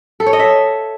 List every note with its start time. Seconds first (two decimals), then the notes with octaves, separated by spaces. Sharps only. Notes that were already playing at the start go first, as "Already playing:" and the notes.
0.20 A4
0.26 C#5
0.33 D#5
0.39 E5